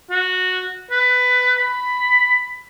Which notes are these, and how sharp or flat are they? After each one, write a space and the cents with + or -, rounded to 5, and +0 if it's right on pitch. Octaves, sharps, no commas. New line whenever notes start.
F#4 -10
B4 +15
B5 +10